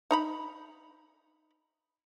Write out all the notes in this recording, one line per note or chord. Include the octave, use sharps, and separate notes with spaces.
D#4 A#5 B5